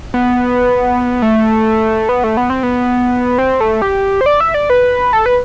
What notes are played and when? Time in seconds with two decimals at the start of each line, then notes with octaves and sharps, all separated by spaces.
0.14 B3
1.22 A3
2.09 B3
2.24 A3
2.37 B3
2.50 C4
2.63 B3
3.38 C4
3.60 A3
3.82 G4
4.21 C5
4.26 D5
4.40 E5
4.54 D5
4.70 B4
5.13 A4
5.26 B4